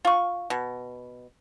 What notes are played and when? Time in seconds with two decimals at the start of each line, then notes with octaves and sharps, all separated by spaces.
0.05 F4 C#6
0.50 B2